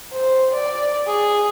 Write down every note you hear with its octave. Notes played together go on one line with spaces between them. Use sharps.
C5
D5
G#4